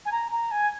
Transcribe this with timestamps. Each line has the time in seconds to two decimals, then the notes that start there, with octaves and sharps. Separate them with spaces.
0.05 G#5
0.11 A#5
0.31 A#5
0.51 G#5